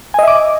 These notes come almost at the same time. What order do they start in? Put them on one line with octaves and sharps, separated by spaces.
G#5 D#5 E5 D6